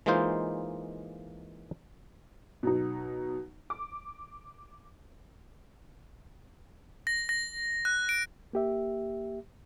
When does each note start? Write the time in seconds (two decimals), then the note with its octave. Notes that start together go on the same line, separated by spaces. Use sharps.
0.06 E3 G#3 A#3 D#4 F4 C5
2.63 B2 F#3 D#4
3.70 D6
7.07 A#6
7.29 A#6
7.85 F#6
8.09 D7
8.53 A#3 G4 E5